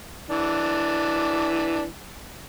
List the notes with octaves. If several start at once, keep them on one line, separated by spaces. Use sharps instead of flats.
E3 D4